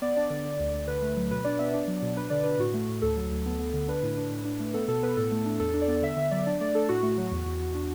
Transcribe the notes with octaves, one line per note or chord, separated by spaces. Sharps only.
B3 D5
D4 D5
D3 D5
D3
D2
D2
D3 B4
A3
F#3
B2 B4
D4 D5
B3 E5
D4 D5
F#3
B2
D4 B4
D3 D5
D4 B4
A2 F#4
A3
A2
D2 A4
F#3
D2
B3
B3
D3
D4 B4
A2
D4
A2
D4
A3
B3 A4
B2 A4
B3 B4
A2 A4
A3
D4
E2 A4
D4
D5
B3
D3 E5
D3 E5
F#3 D5
D4 D5
A3 D5
D4 A4
A2 F#4
A3
F#3
E2
E2
E2
D4